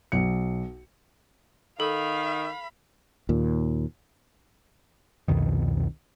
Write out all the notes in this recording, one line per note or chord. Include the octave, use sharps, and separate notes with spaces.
B1 C#7
D#3 A4 F5 B5
D#2 A#2
C2 F2 B2 D#3